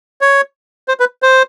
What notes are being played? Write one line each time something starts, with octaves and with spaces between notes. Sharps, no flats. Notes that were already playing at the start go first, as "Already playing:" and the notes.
C#5
C5
B4
C5